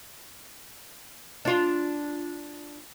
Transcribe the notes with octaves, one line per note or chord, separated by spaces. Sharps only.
D4 F4